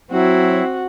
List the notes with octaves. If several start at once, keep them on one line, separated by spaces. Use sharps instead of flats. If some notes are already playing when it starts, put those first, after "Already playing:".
F#3 C4 E4 F#4